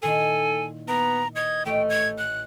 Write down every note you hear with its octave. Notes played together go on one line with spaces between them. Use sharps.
A#2 D#3 E4 A4 G#5
B3 A#5
B4 D#5 G#6
A1 A3 D#5 G5 C#6
G#6
F#6